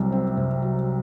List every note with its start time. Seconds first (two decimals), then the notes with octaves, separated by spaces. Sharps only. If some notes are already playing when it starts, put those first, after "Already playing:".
Already playing: C2 C3 F#3 C4
0.12 C4
0.37 C3
0.62 F#3